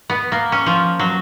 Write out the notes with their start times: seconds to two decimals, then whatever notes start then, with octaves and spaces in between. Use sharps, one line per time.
0.10 B3
0.32 A#3
0.52 C#4
0.66 F3
0.99 F#3